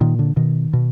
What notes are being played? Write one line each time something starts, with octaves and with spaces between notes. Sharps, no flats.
A#2 D#3
D3
B2 D#3
B2